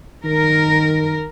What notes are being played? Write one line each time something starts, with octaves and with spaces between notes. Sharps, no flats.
D#3 A#4